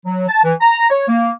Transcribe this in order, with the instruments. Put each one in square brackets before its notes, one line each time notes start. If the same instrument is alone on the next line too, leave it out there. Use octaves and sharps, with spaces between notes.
[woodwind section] F#3
A5
E3
A#5
C#5
A#3